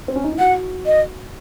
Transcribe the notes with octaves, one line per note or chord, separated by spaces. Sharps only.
C4
C#4
D#4
E4
F#4 F#5
D#5